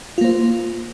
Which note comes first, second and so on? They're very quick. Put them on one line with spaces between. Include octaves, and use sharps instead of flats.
F4 A#3 C5